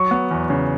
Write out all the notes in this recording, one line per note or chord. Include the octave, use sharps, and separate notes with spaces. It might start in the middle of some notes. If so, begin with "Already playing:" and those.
Already playing: F#3 C#6
B3
E2
C#3